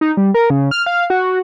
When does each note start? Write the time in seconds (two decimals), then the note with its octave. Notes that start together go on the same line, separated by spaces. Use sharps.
0.01 D#4
0.17 G3
0.34 A#4
0.50 C#3
0.71 F6
0.86 F5
1.10 F#4